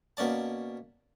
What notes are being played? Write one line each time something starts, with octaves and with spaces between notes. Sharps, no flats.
B2 A#3 C#4 D5 A5